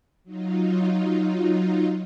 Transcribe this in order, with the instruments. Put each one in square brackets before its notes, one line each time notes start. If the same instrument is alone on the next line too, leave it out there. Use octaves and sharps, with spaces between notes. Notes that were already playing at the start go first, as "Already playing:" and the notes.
[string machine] F#3 D#4 F4